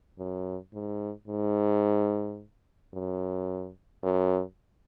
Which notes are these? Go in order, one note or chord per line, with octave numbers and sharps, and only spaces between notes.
F#2
G#2
G#2
F#2
F#2